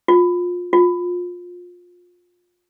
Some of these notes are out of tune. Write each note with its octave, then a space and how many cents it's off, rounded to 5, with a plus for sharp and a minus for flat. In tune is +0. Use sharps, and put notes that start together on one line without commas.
F4 +25
F4 +25